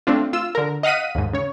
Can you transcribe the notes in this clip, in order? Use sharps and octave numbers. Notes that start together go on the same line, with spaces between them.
A3 C4 D4 F4
F4 E6
D3 A#4
D#5 F5 F#5 B6 D#7
D#2 G#2
C#3 C#5